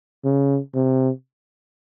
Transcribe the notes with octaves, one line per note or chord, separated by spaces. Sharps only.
C#3
C3